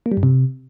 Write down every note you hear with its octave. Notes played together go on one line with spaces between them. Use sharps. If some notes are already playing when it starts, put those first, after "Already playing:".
A#3
G3
G2
C3